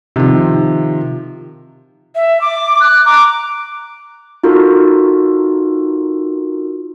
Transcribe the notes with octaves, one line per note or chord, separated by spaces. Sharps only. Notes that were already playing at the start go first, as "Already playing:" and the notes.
C3 D#3 F3
E5
D6
F#6
A#5 D6
D#4 F4 F#4 A4 A#4